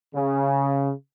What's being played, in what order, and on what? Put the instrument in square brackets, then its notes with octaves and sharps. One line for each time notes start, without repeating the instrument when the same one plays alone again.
[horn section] C#3